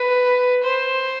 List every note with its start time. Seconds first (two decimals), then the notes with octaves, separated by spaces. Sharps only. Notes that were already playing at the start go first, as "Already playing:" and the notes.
Already playing: B4
0.64 C5